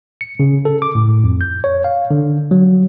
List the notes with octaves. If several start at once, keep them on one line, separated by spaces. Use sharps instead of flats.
C#7
C#3
A4
D6
A2
F2
G6
C#5
F5
D3
F#3